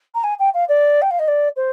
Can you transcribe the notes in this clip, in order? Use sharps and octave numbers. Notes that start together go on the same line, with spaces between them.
A#5
G#5
G5
F5
D5
G5
F5
D#5
D5
C5